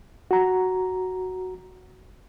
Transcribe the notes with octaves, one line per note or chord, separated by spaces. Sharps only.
F#4 A#5